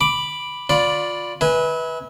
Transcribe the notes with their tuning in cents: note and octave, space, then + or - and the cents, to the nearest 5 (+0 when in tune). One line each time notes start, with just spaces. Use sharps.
B5 +0 D6 +0
F4 +20 D5 -5 B5 +0
B4 -10 E5 -35 G#5 +0